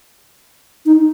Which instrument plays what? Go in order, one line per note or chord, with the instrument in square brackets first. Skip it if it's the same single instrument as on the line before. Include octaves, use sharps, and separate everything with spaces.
[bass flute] D#4